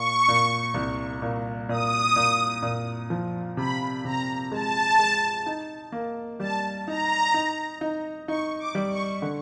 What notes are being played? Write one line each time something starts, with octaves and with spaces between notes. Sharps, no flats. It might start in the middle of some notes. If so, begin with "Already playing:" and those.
Already playing: A#2 C#6
A#2
C2
A#2
A#2 D#6
A#2
A#2
F3
C3 B5
C3 A#5
G#3 A5
G#3
D#4
A#3
G3 A5
D#4 A#5
D#4
D#4
D#4 C#6
D6
G3
C#6
D3